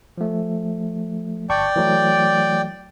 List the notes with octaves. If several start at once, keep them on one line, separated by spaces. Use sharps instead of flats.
F3 A3
G1 D5 G5 A5 C#6
E3 F#3 A3